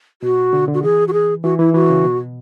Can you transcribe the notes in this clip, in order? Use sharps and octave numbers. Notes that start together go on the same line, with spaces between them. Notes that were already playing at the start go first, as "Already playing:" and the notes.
B2 F#4
D3
D3
F#4
E3 G#4
F#4
G#4
E3 F#4
E3 E4
E3 F#4
C#3
B2